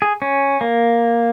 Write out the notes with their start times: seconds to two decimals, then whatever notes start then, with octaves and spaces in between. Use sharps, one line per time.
0.02 G#4
0.22 C#4
0.61 A#3